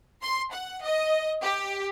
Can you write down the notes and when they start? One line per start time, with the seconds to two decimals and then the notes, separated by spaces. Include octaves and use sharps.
0.22 C6
0.51 F#5
0.83 D#5
1.43 G4